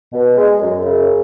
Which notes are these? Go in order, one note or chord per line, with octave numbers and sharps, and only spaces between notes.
B2
G#3
F#2
C#3